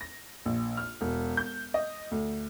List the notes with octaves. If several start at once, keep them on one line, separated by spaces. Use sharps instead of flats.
A#6
A#1
F6
E1
G6
D#5
D2